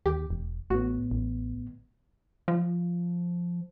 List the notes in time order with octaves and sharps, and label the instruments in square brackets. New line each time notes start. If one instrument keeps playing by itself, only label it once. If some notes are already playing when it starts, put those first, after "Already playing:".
[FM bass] D#2 [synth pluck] G4
[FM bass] E1
[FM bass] A1 [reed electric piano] A2 B3 [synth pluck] F#4
[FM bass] A1
[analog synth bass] F3